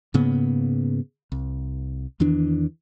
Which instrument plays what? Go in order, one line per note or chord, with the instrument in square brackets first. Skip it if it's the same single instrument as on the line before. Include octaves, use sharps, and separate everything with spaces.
[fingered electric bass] G#2 C#3 A#3 B3
C2
E2 D#3 E3 D4